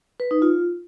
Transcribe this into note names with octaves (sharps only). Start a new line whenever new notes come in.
B4
D#4
F4